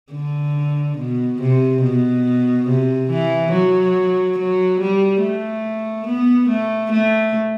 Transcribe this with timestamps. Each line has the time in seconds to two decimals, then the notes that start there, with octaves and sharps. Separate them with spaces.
0.13 D3
0.98 B2
1.41 C3
1.83 B2
2.68 C3
3.10 E3
3.52 F#3
4.38 F#3
4.80 G3
5.22 A3
6.07 B3
6.49 A3
6.92 A3